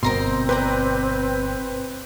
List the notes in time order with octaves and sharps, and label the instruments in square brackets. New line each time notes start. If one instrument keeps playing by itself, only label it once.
[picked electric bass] G1 B2 [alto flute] C4 [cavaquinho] A#4 A#5 C6
[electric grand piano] B4 [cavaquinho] D5 G5 A#5